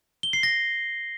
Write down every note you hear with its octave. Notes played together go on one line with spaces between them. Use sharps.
G7
C7
A#6